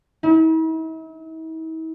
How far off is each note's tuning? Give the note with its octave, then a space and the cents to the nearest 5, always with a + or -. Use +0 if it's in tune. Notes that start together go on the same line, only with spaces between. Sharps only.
E4 -45